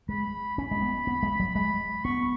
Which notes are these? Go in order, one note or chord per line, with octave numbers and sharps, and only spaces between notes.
G#3 B5
C#4 B5
G#3
B3
B3
G#3
F#3
G#3 B5
B3 C#6